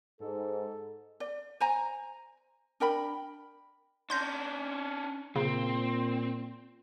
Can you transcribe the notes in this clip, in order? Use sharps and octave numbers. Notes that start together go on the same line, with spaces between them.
G#2 A4
D5
C5 G#5 A#5
D4 A#4 G5 B5
C#4 D4 C6 G6 A#6
A#2 C#3 C4